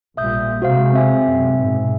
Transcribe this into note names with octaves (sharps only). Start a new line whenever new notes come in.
A#1 A#2 G3 E5 D#6 G6
C3 G#3 F#4 C5 F5
C4 E5 G#5
F#2 C3
G#2 B2